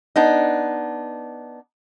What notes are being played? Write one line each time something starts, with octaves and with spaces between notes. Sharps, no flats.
B3 D4 D#4